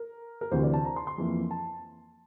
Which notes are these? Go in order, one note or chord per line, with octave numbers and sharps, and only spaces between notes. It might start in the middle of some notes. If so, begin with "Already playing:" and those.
Already playing: A#4
A#4
D2 C3 E3 C5
D5
A5
A#5
C6
C6
F2 E3 A#3
A5